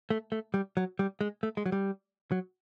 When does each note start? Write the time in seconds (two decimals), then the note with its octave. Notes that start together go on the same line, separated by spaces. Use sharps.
0.10 A3
0.32 A3
0.54 G3
0.77 F#3
0.99 G3
1.21 G#3
1.43 A3
1.57 G#3
1.66 F#3
1.72 G3
2.32 F#3